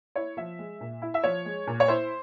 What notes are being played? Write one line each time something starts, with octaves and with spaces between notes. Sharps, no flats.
E4 C#5
F3 E5
G#3
A#2
E4
E5
F3 C#5
G#3
A#2
C#5
E4 C5